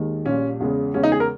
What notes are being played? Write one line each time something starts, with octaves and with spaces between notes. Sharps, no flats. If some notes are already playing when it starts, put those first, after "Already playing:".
Already playing: D#2 D#3 G#3
A#1 A#2 G3 C#4
E2 C#3 G#3
E2 C#3 G#3 C#4
D#4
G#4
A#4